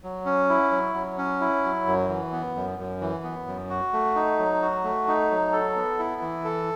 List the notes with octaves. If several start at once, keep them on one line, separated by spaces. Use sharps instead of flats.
F#3
C#4
E4
F#3
F#3
C#4
E4
F#3
F#2
E3
B3
F#2
F#2
E3
B3
F#2
F#4
A3
D#4
F#3
F#4
A3
D#4
F#3
A4
B3
E4
E3
A4